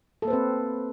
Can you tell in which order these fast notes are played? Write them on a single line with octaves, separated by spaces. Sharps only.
A4 A#3 C5 B4 C4